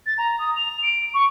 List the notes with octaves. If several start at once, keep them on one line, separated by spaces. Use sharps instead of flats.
A6
A#5
D#6
F7
D7
C#6